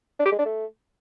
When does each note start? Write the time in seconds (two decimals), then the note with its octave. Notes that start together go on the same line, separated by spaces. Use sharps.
0.19 D4
0.26 G4
0.32 G#3
0.39 D4
0.45 A3